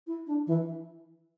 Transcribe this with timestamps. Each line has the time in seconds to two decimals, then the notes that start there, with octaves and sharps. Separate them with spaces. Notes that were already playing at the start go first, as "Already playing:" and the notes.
0.07 E4
0.27 D4
0.47 E3